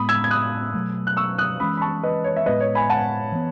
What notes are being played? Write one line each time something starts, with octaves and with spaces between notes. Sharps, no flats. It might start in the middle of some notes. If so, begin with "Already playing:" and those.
Already playing: A2 G#3 B3 B5 D#6
E6 G#6
G#6
D#6 F#6
B2 F#3 A3
F#6
C#6 E6
D#6 F#6
E3 G#3 C#4 B5 D#6
B5
A5 C#6
B4 D#5
C#5
E5
A2 G#3 B3 B4 D#5
C#5
G#5 B5
F#5 A5
E3 B3